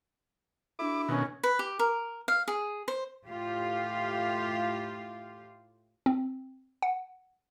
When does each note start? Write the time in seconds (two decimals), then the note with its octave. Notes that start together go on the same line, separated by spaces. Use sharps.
0.79 D4 E4 F#4 A4 D6
1.09 B2 D#3 C#4
1.43 B4
1.59 G4
1.79 A#4
2.28 F5
2.48 G#4
2.88 C5
3.25 A2 F4 G4 F5
6.06 C4
6.82 F#5